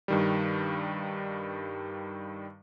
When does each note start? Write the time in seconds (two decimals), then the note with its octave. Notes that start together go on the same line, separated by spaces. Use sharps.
0.08 G2 D#3 G3